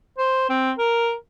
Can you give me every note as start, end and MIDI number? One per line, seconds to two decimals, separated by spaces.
0.18 0.49 72
0.49 0.71 60
0.78 1.14 70